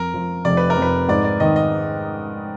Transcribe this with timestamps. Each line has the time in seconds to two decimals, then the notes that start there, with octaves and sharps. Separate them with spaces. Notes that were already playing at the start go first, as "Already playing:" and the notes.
Already playing: F2 A#4
0.14 F3
0.45 F1 D5
0.57 B4
0.70 A#4
0.77 F2
0.82 B4
1.08 G#2 D5
1.24 D5
1.40 D#3 D#5
1.56 D#5